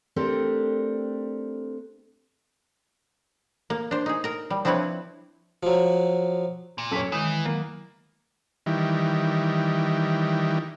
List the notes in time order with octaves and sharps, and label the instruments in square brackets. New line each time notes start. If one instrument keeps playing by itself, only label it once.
[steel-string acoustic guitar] A3 C4 D4 G4 A4 A#4
[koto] A#3
D4 C5
D#4 G#4
A#4 A#5
G3
F3 C4 D4 E4 B4 C#5
[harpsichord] F3 F#3
[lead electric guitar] A#2
[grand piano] F#2 B6 F#7 [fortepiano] A4 C#5
[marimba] D#3 G#3 [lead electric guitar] E3 [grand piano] D#6
[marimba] F#3 [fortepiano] A#3
[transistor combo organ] D#3 E3 G3